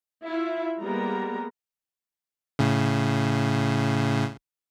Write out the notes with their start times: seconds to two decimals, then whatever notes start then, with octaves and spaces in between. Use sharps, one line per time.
0.24 E4 F4 E5
0.81 G3 G#3 A#3 B3 A#4 A#5
2.59 A2 C#3